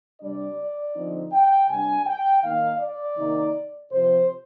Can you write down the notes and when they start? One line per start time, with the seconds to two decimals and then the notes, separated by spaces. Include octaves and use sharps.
0.19 C3 G3 D4 D5
0.95 D3 F3 C4 D#4
1.32 G5
1.68 C3 G3 D4 G#5
2.06 G5
2.42 D#3 A#3 D#4 F5
2.80 D5
3.16 C3 D#3 A#3 D#4
3.91 C3 F3 C4 C5